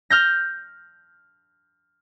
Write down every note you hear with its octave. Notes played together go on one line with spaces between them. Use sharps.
F6 G6 A#6